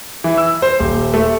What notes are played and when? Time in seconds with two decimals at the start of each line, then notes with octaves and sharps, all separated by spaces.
0.24 E3
0.37 E6
0.62 C5
0.79 D#1
1.14 A3